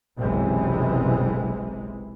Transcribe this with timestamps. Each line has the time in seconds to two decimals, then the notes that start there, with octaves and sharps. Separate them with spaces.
0.17 F#1 B1 C3 E3 G#3